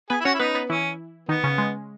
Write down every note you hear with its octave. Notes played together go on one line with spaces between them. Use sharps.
B3 G#4 B4
E4
C#4 F#4 C#5
E4
B3 D#4 B4
B3 B4
E3 C#4 E4
D#3 B3 D#4
C#3 C#4
G#3